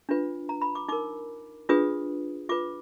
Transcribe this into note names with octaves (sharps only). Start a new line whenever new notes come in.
D4 F4 B4
A#5
B5
D6
D#4 A#4 D6
D4 F4 G#4 B4 D#6
F4 B4 D6